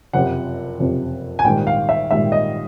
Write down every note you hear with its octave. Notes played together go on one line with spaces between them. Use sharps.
F#1 F2 C3 F3 F#5
F#1 F2 C3 F3
G#5
A#1 G#2 D#3 G3 G5
F5
E5
A#1 G#2 D#3 G3 E5
D#5